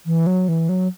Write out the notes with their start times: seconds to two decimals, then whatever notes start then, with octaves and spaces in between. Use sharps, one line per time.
0.06 E3
0.27 F#3
0.48 E3
0.69 F#3